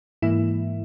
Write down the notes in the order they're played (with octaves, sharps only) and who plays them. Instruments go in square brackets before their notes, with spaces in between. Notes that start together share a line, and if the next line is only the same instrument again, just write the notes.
[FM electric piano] G#2 E3 A#3 E4